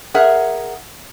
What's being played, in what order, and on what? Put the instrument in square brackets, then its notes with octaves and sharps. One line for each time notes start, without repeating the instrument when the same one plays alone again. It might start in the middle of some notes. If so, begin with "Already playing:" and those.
[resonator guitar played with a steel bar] G#4 A#4 E5 F#5